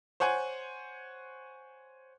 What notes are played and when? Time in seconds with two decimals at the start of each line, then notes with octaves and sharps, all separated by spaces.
0.20 C5 C#5 F#5 G#5